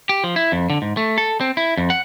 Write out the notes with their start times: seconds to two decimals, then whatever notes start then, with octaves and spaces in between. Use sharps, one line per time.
0.09 G4
0.24 F3
0.36 E4
0.52 F2
0.70 D3
0.82 G#2
0.97 A3
1.18 A4
1.41 C4
1.57 E4
1.77 F2
1.90 F#5